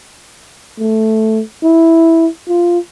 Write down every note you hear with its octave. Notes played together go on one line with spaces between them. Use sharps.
A3
E4
F4